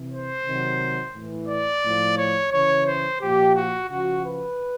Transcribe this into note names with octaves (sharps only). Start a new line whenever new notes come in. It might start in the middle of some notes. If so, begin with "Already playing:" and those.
Already playing: C3 E3
C5
C3 D#3 F#3
A2 E3
D5
A2 F3
C#5
C#3 E3 C#5
C5
A#2 F3 G4
F#4
C#3 F3 F#4
B4